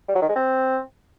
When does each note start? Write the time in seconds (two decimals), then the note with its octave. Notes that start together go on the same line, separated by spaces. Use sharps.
0.08 G3
0.15 F#3
0.22 D#3
0.29 G#3
0.36 C4